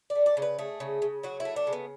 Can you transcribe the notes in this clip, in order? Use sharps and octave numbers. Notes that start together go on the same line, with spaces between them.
D5
A3
D5
C#3
B4
A3 G#4
C#3
C#3
F#3 F#4
E4
A3
D4
C#3
B3